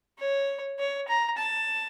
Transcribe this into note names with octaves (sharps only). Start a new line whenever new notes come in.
C#5
C#5
A#5
A5